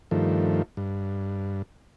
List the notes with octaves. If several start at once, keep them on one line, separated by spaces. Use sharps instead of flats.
G2 D#3 F3 A3
G2